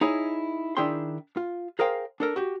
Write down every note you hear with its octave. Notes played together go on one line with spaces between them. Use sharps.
D#4 E4 G#4 C#5
D#3 D4 E4 G#4 G5 C6
F4
G#4 A#4 C5 F5 G5
D4 A4 A#4
F#4 G4